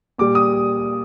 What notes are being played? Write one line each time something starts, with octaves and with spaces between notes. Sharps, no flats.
A#2 G3 D6
D#6